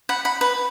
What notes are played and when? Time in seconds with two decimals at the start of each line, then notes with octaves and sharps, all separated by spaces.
0.09 F#5 B5
0.25 F#5 B5
0.41 B4